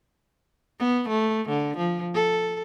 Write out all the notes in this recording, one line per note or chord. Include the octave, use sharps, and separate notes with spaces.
B3
A3
D3
F3
A4